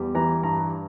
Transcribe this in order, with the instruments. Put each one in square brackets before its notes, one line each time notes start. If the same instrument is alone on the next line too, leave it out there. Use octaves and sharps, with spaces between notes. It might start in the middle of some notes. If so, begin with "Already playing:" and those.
Already playing: [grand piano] E2 G3
E3 A#5
G2 A#5